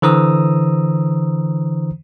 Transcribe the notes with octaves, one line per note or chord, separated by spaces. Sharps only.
D3 E3 C5 A#5 D#6 E6